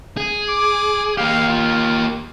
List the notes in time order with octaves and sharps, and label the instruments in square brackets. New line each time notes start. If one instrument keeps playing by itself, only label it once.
[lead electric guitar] G#4
[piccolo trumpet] D6
[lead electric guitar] A#3 G4 [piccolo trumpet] F5
[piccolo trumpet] F4